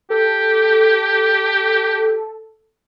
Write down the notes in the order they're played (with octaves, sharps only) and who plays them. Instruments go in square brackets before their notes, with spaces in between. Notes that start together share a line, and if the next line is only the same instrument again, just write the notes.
[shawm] G4 [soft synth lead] A4